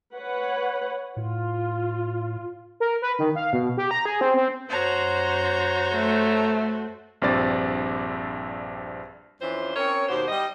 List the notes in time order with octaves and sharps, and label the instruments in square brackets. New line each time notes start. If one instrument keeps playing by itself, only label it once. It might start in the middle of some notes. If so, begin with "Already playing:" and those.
[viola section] B4 C#5 F#5
[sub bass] A2 [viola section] F4
[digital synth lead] A#4
B4
D#3
F5
B2
G4
A#5
G#4
C4
C4
[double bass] F#2 [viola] F#4 C5 [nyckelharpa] C#5 A#5
[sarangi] A3
[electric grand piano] A#1 G2 C4 D5 A6
[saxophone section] F2 E3 C#4 D4 F4 C5
C4 C#4 A#4 C#5
D#2 B2 F#4 G4 C5
G3 D#5